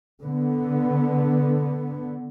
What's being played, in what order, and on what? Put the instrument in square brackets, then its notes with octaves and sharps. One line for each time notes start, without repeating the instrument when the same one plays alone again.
[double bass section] D3 B3